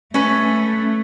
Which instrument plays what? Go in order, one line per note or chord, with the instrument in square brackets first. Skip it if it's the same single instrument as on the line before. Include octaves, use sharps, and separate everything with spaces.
[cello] A3 [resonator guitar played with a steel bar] C#4 B4